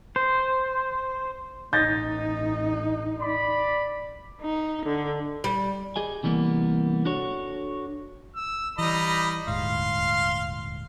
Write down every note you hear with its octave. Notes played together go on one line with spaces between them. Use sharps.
C5
A1 D#4 G6 A6 A#6
D5 B5
D#4
D3
G3
G4 G#4 D#5 G#5
C3 E3 G3 A#3 B3
D4 F#4 A4 C#5
E6
E3 G3 D#5 A#5 B5
D#1 D2 G#2 F5 C6